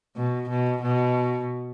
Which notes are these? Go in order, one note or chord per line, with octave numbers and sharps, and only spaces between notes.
B2
B2
B2